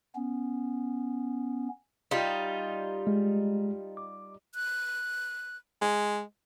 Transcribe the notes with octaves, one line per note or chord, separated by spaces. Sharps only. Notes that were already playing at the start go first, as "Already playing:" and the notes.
B3 C#4
G3 D#4 F4
G#3
D6
F#6
G#3